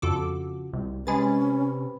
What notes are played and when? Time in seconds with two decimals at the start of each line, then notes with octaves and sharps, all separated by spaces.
0.02 F2 C#3 F4 F#4 A4 D6
0.73 C2 C3
1.07 C3 G#3 C#4 G#4 B4 B5 A6